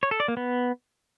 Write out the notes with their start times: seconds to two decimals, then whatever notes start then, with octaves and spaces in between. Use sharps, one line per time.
0.03 C#5
0.11 A4
0.20 D5
0.28 A#3
0.37 B3